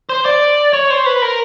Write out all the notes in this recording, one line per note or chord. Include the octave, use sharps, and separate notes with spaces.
C5
D5
C#5
C5
B4
A#4